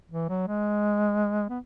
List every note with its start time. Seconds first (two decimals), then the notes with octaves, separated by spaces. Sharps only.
0.11 E3
0.29 F#3
0.48 G#3
1.49 B3